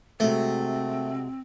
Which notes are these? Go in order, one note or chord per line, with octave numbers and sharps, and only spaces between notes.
C3 G#3 A3 C4 F#4